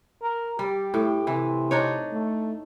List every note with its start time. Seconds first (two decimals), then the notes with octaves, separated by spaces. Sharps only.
0.22 A#4
0.59 G3 G4
0.94 A2
1.27 C3 E3
1.71 D4 D#4 C#5
2.12 A3